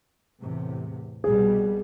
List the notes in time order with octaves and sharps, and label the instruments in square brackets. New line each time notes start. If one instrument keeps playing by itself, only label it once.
[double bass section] E2 A2 C3
[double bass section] C2 B2 G3 [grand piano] G#4